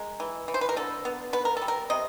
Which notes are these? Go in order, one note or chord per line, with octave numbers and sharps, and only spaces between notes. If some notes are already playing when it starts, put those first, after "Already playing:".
Already playing: G#3 A#4
E3
E3
C5
B4
A#4
D3 A4
B3
B3 B4
A#4
A4
G3
A#4
C3 D#5